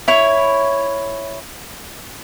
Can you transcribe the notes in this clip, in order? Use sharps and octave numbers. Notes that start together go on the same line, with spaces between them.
E4 C#5